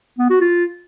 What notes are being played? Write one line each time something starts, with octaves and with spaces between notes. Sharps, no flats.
B3
F#4
F4